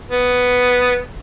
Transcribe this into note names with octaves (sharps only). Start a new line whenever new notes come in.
B3